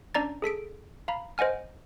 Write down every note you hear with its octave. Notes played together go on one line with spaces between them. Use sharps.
C#4 D4 D5 A#5 A6
G#4 A4 B6 D7
F5 A#5 B5
C5 D#5 F#5 G#5 F6